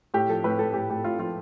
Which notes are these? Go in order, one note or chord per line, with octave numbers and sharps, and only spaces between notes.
A2 G4
F3 A4
A2 B4
A2 A4
A2 G4
A2 G4
A2 F4
F3 F4